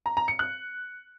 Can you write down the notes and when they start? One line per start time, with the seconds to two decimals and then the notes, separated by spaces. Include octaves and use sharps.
0.06 A#5
0.17 A#5
0.28 C#7
0.39 F#6